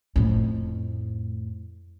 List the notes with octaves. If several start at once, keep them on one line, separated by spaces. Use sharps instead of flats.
F2 A2